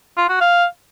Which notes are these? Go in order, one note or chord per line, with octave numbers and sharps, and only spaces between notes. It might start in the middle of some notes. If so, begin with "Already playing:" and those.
F4
F#4
F5